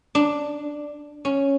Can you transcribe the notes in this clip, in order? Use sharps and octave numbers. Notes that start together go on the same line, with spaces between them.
D4
C#4